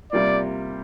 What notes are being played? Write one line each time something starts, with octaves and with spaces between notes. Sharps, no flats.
C3 G3 A#3 F4 D5